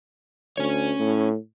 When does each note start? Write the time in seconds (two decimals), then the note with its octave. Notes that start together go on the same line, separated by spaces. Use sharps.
0.57 D2 C#4 C#5
1.00 A2